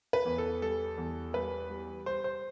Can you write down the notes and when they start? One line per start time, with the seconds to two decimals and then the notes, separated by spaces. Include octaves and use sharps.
0.13 B4
0.25 E2
0.38 A4
0.61 G3 A4
0.98 E2
1.34 G3 B4
1.70 G3
2.06 G3 C5
2.24 C5